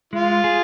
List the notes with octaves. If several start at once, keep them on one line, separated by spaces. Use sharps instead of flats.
G#3 F4
G#4